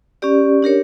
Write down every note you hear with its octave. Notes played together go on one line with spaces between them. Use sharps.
C#4 G4 D5
D4 G4 A#4 C#5